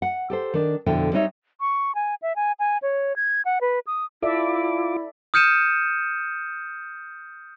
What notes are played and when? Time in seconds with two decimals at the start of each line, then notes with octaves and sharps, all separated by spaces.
0.02 F#5
0.30 G4 A4 C5
0.54 D#3 D4
0.86 F2 B2 D3 D4 E4 G5
1.12 G3 B3 C4 D#4 C#5 E5
1.61 C#6
1.95 G#5
2.22 E5
2.36 G#5
2.59 G#5
2.82 C#5
3.16 G#6
3.45 F#5
3.61 B4
3.87 D#6
4.22 E4 F4 A4 D5 E5 D6
5.34 D#6 F6 G6 C#7 D#7 E7